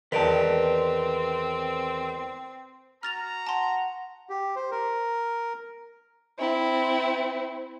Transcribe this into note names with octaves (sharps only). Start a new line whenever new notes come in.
E2 D#3 C4 B4 D5 A5
F#4 A#5 F6 A6 F7
F#5 A5 C6
G4
C5
A#4
C4 E4